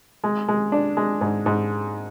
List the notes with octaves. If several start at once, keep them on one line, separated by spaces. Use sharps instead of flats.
G#3
G#3
D4
G#3
G#2
G#2